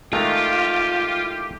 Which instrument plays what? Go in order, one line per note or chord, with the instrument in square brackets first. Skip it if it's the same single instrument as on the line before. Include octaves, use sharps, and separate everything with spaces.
[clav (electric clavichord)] D#3 G#3 A3 [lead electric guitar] F4 [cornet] G4